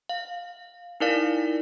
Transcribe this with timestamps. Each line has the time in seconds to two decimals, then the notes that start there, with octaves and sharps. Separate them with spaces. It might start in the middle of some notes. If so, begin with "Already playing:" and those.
0.09 F5
1.00 D#4 E4 A#4 D5 F5